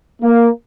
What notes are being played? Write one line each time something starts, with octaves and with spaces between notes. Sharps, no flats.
A#3